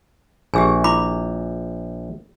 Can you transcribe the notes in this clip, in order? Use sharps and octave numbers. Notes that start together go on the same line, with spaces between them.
A#1 G4 G#4 G#5
E4 B5 D6